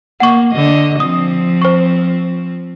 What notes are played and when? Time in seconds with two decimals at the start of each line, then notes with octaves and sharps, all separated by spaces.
0.20 A#3 F#5 C#6
0.53 D3 D#5
1.00 F3 C4 D#6
1.62 C5 C#6